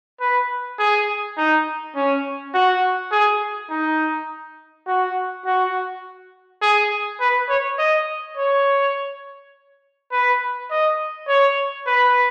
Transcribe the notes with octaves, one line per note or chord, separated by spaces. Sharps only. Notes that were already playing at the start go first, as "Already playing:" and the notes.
B4
G#4
D#4
C#4
F#4
G#4
D#4
F#4
F#4
G#4
B4
C#5
D#5
C#5
B4
D#5
C#5
B4